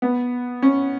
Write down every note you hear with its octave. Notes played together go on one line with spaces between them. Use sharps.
B3
C#4